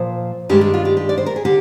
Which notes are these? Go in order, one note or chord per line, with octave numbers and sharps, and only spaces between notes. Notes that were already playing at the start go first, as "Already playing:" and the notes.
Already playing: A#2 F3 C5
G2 D#3 G#3 D4 G4
G4
F4
G4
G4
D5
C5
A#4
G#4
D3 G4